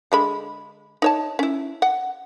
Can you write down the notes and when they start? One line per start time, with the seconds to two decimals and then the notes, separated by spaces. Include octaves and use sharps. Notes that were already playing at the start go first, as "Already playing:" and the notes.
0.12 D3 G#3 B5
1.02 D#4 C#5 A5
1.39 C#4 E4
1.82 F#5